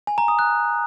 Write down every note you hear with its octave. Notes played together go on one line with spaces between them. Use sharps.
G#5
A#5
D#6
F#6